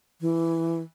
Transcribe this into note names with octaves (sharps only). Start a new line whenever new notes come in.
E3